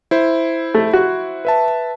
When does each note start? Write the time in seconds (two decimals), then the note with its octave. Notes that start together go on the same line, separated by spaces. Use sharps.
0.11 E4 C5
0.74 A3
0.93 F#4
1.45 B4 E5 A5